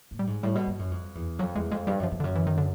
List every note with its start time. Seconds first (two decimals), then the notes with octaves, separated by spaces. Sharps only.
0.11 A2
0.19 G3
0.27 G#2
0.43 A2 G3
0.55 B2
0.67 G2
0.79 F#2
0.91 F2
1.15 E2
1.39 F2 F#3
1.55 E2 G#3
1.71 F2 G#3
1.87 G2 G3
2.00 F#2 F3
2.11 F2
2.20 D3
2.24 F#2
2.35 E3
2.47 D#3
2.58 D3